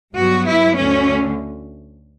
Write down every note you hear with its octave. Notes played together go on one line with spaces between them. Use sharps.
G2 F#3 B3 F#4
E4
D2 D3 A3 C#4